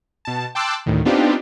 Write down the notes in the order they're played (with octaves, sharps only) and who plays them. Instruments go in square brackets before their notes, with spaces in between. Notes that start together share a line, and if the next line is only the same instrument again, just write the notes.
[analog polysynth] B2 A5
G5 A5 C6 D6 E6 F#6
D2 A2 D#3
B3 C4 D4 D#4 F4 G4